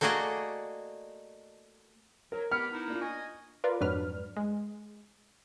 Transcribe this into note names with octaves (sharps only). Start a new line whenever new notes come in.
A3 A#3 F#4 G#4 D5 D#5
F#3 A#4
B3 G4 B5 F6 C#7
D#4 E4
A#3 D4 F4
D#5 G#5 C#6
F4 A#4 B4 D5
F2 G#2 F#3 D4 B4 F6
G#3